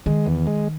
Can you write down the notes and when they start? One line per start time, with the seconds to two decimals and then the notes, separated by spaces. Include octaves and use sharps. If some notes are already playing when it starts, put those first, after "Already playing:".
0.06 D#3 G#3
0.26 E2
0.47 G#3